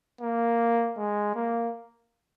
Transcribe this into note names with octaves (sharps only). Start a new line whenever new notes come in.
A#3
G#3
A#3